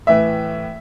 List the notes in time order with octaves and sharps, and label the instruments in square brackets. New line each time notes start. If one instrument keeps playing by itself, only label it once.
[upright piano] A2 E3 E5